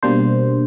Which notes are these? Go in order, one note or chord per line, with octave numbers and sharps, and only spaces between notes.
B2 G3 A#3 D4 C5